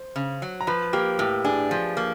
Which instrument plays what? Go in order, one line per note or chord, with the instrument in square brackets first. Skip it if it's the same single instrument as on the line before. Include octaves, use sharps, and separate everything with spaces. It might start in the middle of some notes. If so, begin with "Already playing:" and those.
Already playing: [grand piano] C5
[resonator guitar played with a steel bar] C#3
F#3
[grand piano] A#5
[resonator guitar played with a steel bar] F3 [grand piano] B4 B5
[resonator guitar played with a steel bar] A#3 [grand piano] G4 G5
[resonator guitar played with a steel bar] A2 [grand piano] G4 G5
[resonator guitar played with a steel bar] D4 [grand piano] G#4 G#5
[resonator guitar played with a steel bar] F3
A#3